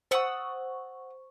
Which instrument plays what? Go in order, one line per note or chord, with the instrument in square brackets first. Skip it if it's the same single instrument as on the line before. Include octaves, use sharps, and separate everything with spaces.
[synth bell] C5 C#6 [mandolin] F#5 D#6 E6